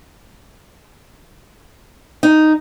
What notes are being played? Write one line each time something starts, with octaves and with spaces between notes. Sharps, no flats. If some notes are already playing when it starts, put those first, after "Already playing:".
D#4